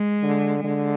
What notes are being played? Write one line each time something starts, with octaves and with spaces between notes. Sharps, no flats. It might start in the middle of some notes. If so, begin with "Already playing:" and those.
Already playing: G#3
D3
D3 G#3